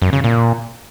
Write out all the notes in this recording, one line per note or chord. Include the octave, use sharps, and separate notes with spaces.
F#2
C#3
A#2